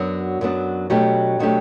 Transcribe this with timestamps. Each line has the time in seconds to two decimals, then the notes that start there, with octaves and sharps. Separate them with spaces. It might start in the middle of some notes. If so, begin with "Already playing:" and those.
Already playing: F#2 F#3 B3 D4
0.41 F#2 F#3 B3 D4
0.90 B2 F#3 A3 D4 G4
1.39 B2 F#3 A3 D4 G4